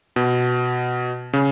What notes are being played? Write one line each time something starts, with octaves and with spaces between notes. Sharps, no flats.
B2
C#3